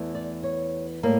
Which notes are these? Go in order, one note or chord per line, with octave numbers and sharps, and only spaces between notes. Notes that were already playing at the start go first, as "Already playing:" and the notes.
Already playing: E2 E3 A3
D5
C#5
A2 G3 A#3 A#4